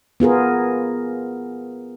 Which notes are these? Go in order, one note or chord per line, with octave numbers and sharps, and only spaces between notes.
B3 F4 G#4 A#4